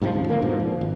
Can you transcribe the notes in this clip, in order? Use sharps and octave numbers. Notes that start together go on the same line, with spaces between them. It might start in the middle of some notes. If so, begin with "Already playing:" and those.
G#2 C3 D#3 F3
D2 G#2 C#3 F3
D#1 D3 A#3
F2 G#2 B2 F3
A#2 F3
G#1